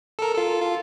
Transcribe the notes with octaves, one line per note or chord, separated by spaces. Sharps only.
A4 A#4
F4 A4
F4